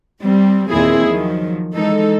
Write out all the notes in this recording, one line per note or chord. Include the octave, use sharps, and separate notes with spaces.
G3 C4
D#2 A#2 E3 C4 E4 G#4
D#3 F3 F#3
E3 G#3 D#4 A4